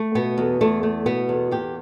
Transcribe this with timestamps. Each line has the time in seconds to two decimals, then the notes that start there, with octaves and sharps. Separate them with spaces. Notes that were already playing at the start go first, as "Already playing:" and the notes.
Already playing: A3
0.15 B2 B3
0.38 E2
0.61 E2 A3
0.83 A3
1.06 B2 B3
1.29 E2
1.51 E2 G4